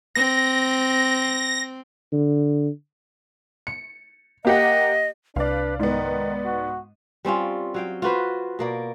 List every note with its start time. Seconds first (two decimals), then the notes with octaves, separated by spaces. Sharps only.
0.15 C4 A#6
2.13 D3
3.67 C#7
4.45 A#3 G4 D#5 F#5
5.36 C2 D4 B4 D5 F5
5.80 G#2 D#3 B3 D5
6.45 F#4
7.25 G3 C4 C#4 F4
7.74 F#3 F5 G5
8.02 F4 F#4 B4 C5
8.59 B2 A#3 D5